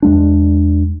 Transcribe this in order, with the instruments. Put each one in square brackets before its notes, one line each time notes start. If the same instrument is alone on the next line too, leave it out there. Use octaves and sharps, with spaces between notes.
[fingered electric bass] E2 G#3 D4